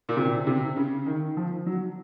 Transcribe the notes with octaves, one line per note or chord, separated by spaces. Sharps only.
A#2
C3
C3
C#3
D#3
F3
F#3